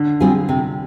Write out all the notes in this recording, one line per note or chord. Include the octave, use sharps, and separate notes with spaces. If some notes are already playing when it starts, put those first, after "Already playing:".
Already playing: D3
G3 C4 F4 G#4
C3